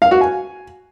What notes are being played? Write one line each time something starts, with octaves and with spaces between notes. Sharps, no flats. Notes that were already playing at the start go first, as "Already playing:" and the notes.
F5
F#4
G#5